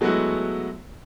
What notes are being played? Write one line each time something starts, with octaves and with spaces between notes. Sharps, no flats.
F#3 G#3 A3 B3 E4 F#4